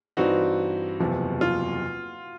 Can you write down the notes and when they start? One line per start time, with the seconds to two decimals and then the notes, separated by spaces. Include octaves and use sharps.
0.17 G2 E3 G3 C4 D#4 F#4
1.00 F#1 E2 C3 F3
1.41 F4